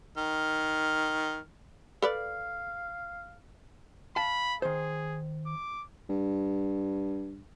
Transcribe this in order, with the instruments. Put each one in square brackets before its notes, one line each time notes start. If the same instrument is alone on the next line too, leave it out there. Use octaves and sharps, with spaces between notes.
[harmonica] D#3 F6
[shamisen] A4 B4 D5 [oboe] F5
[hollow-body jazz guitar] F5 A5 [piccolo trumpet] B5
[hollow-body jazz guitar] D#3 C5 [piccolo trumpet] G#4
[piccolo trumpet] D6
[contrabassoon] G2